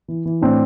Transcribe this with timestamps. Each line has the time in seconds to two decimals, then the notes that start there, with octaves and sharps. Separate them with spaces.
0.08 E3
0.25 E3
0.42 A2 C4 D4